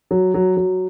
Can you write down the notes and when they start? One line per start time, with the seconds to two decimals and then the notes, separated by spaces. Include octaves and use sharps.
0.11 F#3
0.34 F#3
0.57 F#3